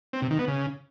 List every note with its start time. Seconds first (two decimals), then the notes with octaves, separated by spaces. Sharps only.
0.13 C4
0.22 C3
0.30 D#3
0.39 B3
0.48 C#3